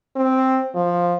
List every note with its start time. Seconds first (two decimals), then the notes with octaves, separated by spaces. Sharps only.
0.16 C4
0.75 F3